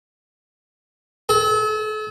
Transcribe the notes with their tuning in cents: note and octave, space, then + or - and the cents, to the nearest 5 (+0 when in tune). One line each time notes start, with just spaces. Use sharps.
A4 -40